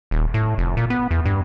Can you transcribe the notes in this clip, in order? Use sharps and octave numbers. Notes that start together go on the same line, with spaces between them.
D#1
A2
F1
A#2
B3
E2
G2